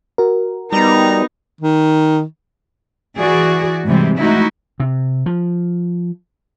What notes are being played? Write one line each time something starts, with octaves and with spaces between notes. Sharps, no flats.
F#4 A#4
G3 B3 D#4 A#5
D#3
E3 F#4 G#4 D5
G#2 C3 E3 G3 G#3 C4
E3 G#3 A3 D#4 E4 F#4
C3
F3